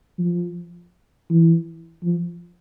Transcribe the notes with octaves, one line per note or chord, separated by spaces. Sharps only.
F3
E3
F3